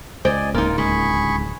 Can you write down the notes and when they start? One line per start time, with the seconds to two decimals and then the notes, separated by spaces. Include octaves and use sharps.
0.25 C#2 C5 D5 D#5 G5 G#5
0.54 D1 A#3 D#4 F4 A#4
0.78 C#2 G#4 B5 C#6